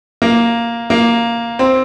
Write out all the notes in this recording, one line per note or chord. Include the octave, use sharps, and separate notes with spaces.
A#3
A#3
C4